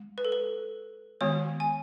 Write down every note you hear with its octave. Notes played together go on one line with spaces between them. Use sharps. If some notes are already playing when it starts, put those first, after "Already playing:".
Already playing: G#3
B4
A4
B4
D#3 G#3 B3 F#4 C#5
G#5